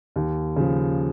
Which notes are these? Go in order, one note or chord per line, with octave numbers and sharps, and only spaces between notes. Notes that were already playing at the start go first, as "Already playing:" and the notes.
D#2
C#3 F3